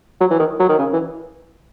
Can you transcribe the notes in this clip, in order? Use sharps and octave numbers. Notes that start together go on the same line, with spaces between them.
F#3
E3
D#3
F#3
D#3
C#3
E3